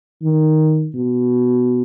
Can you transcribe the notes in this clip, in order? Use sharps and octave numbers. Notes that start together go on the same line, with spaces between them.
D#3
B2